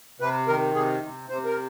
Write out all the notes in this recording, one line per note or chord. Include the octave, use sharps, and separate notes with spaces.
C3 B4
D#3 A#4
C3 G#4
C3
C3 C5
A#4